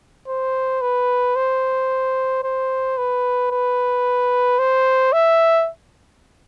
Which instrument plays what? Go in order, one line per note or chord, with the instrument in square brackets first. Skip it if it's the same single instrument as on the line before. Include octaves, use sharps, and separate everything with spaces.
[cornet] C5
B4
C5
C5
B4
B4
C5
E5